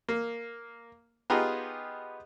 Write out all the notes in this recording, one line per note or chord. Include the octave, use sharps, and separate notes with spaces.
A#3
B3 D#4 F4 G4 G#4 A#5